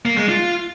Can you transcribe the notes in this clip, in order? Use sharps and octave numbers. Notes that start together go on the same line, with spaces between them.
A#3
G#3
F4